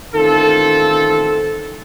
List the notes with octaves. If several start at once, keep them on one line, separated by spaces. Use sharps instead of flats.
A1 D#3 C4 F4 A4